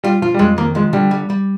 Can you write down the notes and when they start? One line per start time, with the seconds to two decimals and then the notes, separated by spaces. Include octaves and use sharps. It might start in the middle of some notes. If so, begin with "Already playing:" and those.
0.04 G3 F4
0.22 F3 F4
0.34 G3
0.39 F2 G#3
0.58 D#3 A#3
0.75 F3 G#3
0.93 D3 G3
1.11 G3
1.30 G3